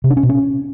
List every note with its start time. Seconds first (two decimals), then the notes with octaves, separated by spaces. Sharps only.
0.04 C3
0.10 D4
0.17 C#4
0.23 B2
0.29 C#4